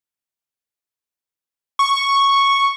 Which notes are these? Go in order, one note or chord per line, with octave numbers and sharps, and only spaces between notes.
C#6